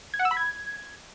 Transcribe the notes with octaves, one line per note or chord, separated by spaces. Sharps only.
G#6
F#5
E6
B5
G#6